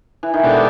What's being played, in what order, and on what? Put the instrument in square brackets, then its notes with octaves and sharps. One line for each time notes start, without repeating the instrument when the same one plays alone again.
[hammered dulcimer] E3
D#3
[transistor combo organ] B2 G#3 B3 D4 G4 [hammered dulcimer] D3